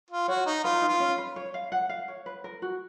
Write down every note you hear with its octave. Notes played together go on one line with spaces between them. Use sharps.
F4
F#4 C#5
D#4
F4 B4
D#4
F4
C#4
B4
C#5
F5
F#5
F5
C#5
B4
A#4
F#4